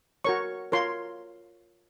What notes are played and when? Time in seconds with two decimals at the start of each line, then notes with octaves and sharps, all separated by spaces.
0.24 F#4 A#4 C#5 C#6
0.72 F4 A#4 C#5 C6